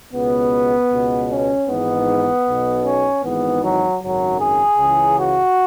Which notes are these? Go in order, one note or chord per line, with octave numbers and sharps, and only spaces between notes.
C#2 B2 B3
C#2 B2
C#4
G#1 G#2 E3 B3
B1 B2
C#4
G#1 G#2 E3 B3
F#3
G#1 F#2 C#3 F#3
G#4
C#2 C#3 E3
F#4